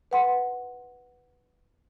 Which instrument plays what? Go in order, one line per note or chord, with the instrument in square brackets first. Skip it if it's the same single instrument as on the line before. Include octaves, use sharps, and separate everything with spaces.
[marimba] B4 F#5 C6